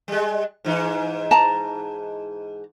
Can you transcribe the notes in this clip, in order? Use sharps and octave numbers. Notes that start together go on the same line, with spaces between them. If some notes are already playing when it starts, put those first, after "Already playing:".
G3 G#3
G#2 E3 D#4
A5 A#5